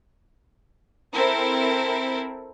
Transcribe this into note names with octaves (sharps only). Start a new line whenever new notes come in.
C4 E4 A4 A#4